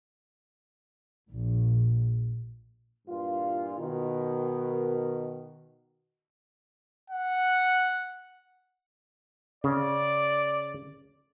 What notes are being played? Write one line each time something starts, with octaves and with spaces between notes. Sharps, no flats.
A#1
G2 A#2 E3 F4
B2 D#3
F#5
C#3 D5